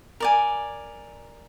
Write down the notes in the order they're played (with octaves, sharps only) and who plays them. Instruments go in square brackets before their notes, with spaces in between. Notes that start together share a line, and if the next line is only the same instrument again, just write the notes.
[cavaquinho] A#4 D5 G#5